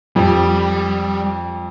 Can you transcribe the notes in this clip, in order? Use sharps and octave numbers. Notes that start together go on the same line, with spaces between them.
F2 G3